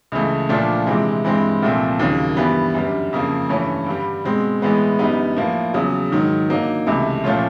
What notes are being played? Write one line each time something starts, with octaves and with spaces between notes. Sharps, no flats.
C#2 C#3 E3 A3
A#2 F3 A3 D4 F4
C3 E3 G#3 C4
G2 E3 G#3 C4
C2 A#2 F3 A3 C4
D#2 C#3 F#3 A#3
G2 E3 G3 B3
F#2 D3 G3
F2 C#3 F3 A#3
G2 E3 A3 C#4
G2 D3 G3
B2 G#3 C4
A2 E3 G#3 B3
F#2 D3 G3 B3 D#4
A2 F3 A#3
E2 C#3 F#3
G#2 D#3 F#3
D3 F#3 A#3 D#4
C#2 C3 E3 A3
A#2 F3 A3 C#4 F4